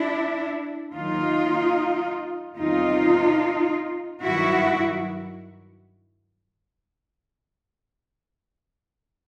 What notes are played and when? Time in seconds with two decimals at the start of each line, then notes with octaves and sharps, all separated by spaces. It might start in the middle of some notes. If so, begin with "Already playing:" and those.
Already playing: D4 E4
0.93 D#2 D#3 F#3 D#4 F4
2.57 E2 C3 D#3 G3 D#4 F4
4.22 G2 D#3 F#3 E4 F#4